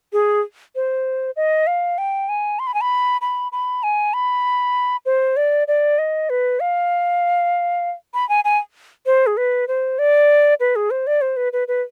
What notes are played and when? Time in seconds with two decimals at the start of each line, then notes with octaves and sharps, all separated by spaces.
0.13 G#4
0.76 C5
1.36 D#5
1.67 F5
1.98 G5
2.29 G#5
2.59 C6
2.67 B5
2.74 G#5
2.81 B5
3.21 B5
3.52 B5
3.83 G#5
4.14 B5
5.06 C5
5.37 D5
5.68 D5
5.98 D#5
6.30 B4
6.60 F5
8.14 B5
8.29 G#5
8.45 G#5
9.06 C5
9.27 G#4
9.37 B4
9.68 C5
9.99 D5
10.60 B4
10.76 G#4
10.91 C5
11.07 D5
11.21 C5
11.37 B4
11.53 B4
11.68 B4